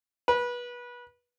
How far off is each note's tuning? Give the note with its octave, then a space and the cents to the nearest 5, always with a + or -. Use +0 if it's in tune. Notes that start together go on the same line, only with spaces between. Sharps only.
B4 -25